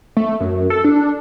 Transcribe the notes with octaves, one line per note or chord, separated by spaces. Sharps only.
A3
F#2
A4
D4